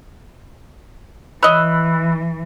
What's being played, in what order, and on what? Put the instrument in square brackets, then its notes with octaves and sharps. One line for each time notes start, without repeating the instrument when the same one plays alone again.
[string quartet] E3 [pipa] C#5 D#5 [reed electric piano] B5 E6 F#6